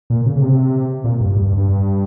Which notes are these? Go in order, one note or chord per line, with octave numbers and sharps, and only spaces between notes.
A#2
C#3
C#3
C3
A#2
G2
G2
G2
G2